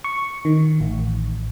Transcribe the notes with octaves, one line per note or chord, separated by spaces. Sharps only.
C#6
D#3
A1